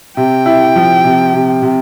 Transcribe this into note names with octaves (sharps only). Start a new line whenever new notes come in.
C3 G5
E4
F3
C3
C3
C3